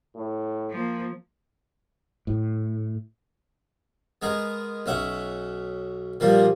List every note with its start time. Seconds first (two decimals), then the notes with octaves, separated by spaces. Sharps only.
0.16 A2
0.71 F3 A#3
2.27 A2
4.22 G#3 B3 G#4 A#4
4.86 B1 C#4 E5 F#5
6.20 A#2 F3 G3 A#3